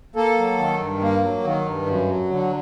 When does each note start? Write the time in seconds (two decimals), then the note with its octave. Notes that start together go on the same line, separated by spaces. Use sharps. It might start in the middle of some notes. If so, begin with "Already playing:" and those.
0.16 A#3 A4
0.37 F#3
0.58 D#3
0.80 G2
1.02 A#3
1.23 F#3
1.44 D#3
1.66 G2
1.87 F#2
2.08 F#3
2.30 D3